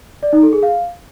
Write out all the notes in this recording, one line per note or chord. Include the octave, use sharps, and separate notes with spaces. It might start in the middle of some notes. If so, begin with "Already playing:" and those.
D5
D#4
A4
G#4
F5